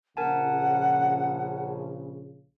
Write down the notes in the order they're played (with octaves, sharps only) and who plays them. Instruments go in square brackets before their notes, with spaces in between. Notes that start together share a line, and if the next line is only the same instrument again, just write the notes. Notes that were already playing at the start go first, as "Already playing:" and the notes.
[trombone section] A#1 C#3 [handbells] A#4 G#5 A5 [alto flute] F#5